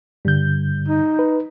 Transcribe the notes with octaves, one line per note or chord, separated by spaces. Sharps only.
G2 D3 G3 G6
D#4
B4